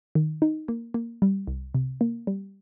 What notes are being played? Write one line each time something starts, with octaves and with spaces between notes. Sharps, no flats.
D#3
D#4
A#3
A#3
G3
C2
C3
A#3
G3